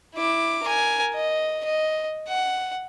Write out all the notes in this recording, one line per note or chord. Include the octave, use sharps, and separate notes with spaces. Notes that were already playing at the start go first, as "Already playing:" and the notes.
E4 D6
A#4 G#5
D#5
D#5
F#5